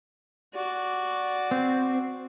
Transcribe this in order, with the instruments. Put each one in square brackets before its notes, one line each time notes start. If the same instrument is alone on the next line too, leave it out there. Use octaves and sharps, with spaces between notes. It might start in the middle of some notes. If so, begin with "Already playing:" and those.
[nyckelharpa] F#4 D5
[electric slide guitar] C4